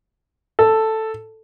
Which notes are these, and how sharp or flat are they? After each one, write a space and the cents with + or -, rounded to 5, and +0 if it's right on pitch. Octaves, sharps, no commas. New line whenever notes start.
A4 +5